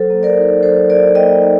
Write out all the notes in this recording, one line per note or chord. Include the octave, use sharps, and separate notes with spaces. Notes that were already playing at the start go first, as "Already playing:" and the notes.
Already playing: F#3 A4 C5
A#3
A#4 D5
D#4
F#3 A4 C5
F#3 A#4 D5
A#3 D#5 G5
D#4